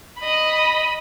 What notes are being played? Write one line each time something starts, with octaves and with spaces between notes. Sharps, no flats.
D#5 B5